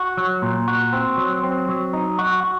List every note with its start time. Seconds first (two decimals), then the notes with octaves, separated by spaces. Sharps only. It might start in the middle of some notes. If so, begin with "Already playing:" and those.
Already playing: F#4
0.17 F#3
0.42 A#2
0.68 F#4
0.93 C4
1.18 F#3
1.43 C4
1.69 F#3
1.93 D#4
2.19 F#4
2.43 F#4